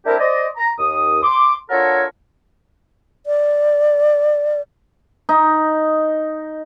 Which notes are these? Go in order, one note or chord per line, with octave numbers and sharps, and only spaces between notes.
A3 C4 D4 E4 G4 A#4
C5 D5 D#5
A#5
D#2 D#6
C6 D6
D4 F4 F#4 A4 A#4 C#5
D5
D#4